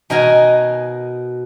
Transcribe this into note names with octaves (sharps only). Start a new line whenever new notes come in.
B2 D#4 A#4 G#5 A#5